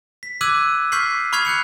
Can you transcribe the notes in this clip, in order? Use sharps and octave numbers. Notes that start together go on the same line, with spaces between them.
B6
D6 E6 F#6 G#6 D#7 F#7
C#6 F6 G6 B6 C7 F#7
B5 C#6 F6 G#6 C7 F7
F#6 G6 C#7 F7